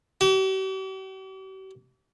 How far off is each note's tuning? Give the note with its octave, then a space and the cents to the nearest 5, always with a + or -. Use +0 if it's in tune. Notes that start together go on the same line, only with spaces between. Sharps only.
G4 -45